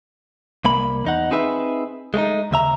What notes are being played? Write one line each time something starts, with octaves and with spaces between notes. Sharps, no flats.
C2 A#3 B5
E2 D#4 F#5
C4 D#4 G#4 B4 E5
G#3 A3 C#4 D#4
D#2 C#3 E5 A#5